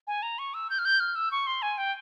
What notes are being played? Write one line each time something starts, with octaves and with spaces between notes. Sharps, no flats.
G#5
A#5
C#6
E6
G6
F6
G6
F6
E6
C#6
C6
G#5
G5